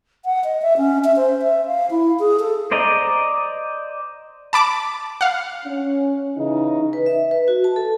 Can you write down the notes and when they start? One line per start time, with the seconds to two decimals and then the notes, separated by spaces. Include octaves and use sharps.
0.25 F#5
0.44 D#5
0.62 E5
0.78 C#4
1.04 E5
1.16 C5
1.42 E5
1.66 F5
1.91 E4
2.20 G#4
2.40 A4
2.71 C5 D5 D#5 A#5
4.53 A5 B5 D6
5.21 F5 F#5
5.65 C#4
6.37 C#3 E3 D#4
6.93 B4
7.06 E5
7.31 B4
7.48 F#4
7.64 A5
7.76 A4